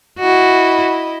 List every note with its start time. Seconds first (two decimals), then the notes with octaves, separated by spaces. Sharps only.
0.19 E4 F#4 D#5